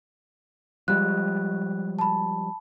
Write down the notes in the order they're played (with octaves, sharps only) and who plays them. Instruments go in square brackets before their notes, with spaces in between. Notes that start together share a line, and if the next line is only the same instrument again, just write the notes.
[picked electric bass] F3 G3 G#3 [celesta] F#6
[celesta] A5 B5